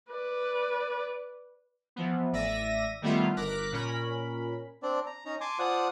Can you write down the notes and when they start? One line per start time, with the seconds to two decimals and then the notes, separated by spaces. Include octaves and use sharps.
0.11 B4 D5
1.96 E3 F3 B3
2.33 A1 D5 E5 A#6 D#7
3.02 D#3 G3 A3 B3 E4 F4
3.36 G1 A#4 D6 F#6 B6
3.72 A#2 C#4 A#4 B5
4.83 C4 D4 D5
5.06 A#5
5.25 C#4 D#4 A#5
5.41 G#5 A5 C6 D6
5.59 F4 C5 D5 F#5 A5 D#6